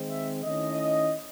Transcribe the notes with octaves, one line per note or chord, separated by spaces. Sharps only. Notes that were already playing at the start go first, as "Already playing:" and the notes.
Already playing: D#3 G#3 C4
E5
D#3 A3 C#4 E4 D#5